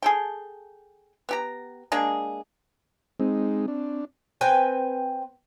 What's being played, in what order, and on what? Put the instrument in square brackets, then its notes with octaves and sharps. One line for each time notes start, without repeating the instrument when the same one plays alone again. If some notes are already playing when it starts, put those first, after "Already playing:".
[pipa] G#4 A4 G5
B3 G4 A#5
G#3 A#3 D4 G#4
[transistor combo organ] G#3 D#4 [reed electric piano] C4
[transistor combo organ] D4
[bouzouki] C4 B4 G5 G#5